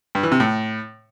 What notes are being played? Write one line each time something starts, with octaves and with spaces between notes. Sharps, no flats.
G2
E3
C3
A2